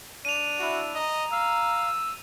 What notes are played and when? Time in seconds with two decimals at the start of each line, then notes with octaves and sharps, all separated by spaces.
0.25 D4 D#7 F7
0.59 E4 F#4
0.95 D#5 A#5
1.32 F5 E6